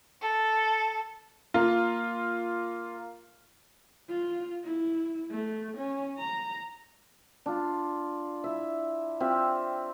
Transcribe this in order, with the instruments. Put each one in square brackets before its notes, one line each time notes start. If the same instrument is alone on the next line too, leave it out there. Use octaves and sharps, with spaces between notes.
[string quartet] A4
[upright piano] A#3 F4
[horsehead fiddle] F4
E4
A3
C#4
A#5
[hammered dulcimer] D4 F4
E4 E5
C4 F4 G4 E5